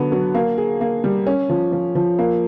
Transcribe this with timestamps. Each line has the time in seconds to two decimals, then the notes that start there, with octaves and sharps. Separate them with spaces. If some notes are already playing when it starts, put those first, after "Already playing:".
Already playing: D3 F#3 B3
0.12 F#3
0.35 A#3
0.58 G#4
0.81 A#3
1.04 G3
1.27 C#4
1.49 F3
1.72 F3
1.95 F3
2.19 A#3